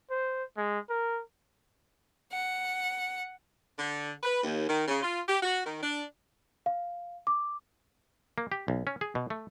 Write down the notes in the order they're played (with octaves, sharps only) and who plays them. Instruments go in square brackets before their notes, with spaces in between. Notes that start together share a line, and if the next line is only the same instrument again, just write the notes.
[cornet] C5
G#3
A#4
[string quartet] F#5
[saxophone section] D3
B4
D#2
D#3
C#3
F4
G4
F#4
D#3
D4
[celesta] F5
D6
[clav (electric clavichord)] A#3
G4
B1
C#4
G#4
B2
A3